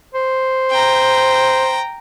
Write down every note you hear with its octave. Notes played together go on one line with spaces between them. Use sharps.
C5
G5 A#5